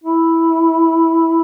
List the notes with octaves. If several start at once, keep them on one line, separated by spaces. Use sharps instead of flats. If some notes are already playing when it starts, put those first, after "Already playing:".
E4